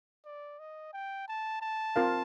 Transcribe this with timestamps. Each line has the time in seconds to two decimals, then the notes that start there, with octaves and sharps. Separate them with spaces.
0.25 D5
0.59 D#5
0.93 G5
1.28 A5
1.62 A5
1.96 C4 F4 A#4 F5